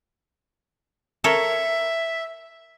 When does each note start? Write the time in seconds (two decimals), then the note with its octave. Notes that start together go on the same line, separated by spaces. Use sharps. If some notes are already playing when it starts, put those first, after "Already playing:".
1.24 A4 A#4 C#5 E5